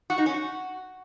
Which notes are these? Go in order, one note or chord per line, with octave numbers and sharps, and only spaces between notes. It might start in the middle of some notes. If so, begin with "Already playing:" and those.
F#4
D#4
C#4
F#4